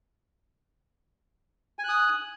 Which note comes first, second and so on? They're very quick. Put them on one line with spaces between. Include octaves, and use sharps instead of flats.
G#5 F#6 D#6